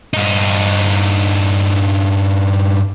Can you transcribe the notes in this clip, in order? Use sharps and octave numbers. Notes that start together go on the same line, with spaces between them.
G2 D#4